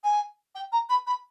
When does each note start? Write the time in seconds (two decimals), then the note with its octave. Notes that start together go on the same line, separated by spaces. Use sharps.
0.04 G#5
0.55 G5
0.72 A#5
0.89 B5
1.07 B5